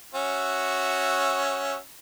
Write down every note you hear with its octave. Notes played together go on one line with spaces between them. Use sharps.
C#4 F#4 E5